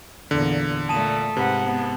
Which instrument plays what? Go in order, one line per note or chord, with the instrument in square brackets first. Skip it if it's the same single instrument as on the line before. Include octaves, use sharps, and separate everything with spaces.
[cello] E2 A#2 [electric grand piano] D3
[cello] A#2 A3 [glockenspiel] A5 D#6 E7
[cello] G#2 [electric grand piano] C3 [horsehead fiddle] B4 F#5
[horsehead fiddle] B3